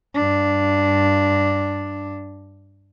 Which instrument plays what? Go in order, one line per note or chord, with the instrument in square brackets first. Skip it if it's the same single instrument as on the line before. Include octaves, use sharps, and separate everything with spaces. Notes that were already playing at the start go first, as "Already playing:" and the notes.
[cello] G2 D4